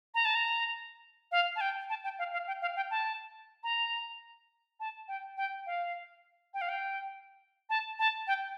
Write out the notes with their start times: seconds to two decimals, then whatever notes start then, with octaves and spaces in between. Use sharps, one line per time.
0.15 A#5
0.25 A5
0.35 A#5
1.32 F5
1.56 A5
1.61 G5
1.89 A5
2.04 G5
2.19 F5
2.33 F5
2.47 G5
2.62 F5
2.76 G5
2.91 A5
3.63 A#5
4.80 A5
5.08 G5
5.37 G5
5.66 F5
6.54 G5
6.61 F5
6.69 G5
7.70 A5
7.99 A5
8.27 G5